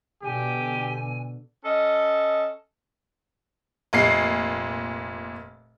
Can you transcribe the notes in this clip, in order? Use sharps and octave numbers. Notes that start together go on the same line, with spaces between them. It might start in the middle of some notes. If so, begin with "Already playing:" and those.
B2 D3 G4 G#5
C#4 A4 D#5
F1 A#2 C7